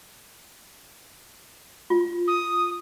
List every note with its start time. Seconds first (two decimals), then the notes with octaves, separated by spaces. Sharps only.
1.90 F4
2.27 D#6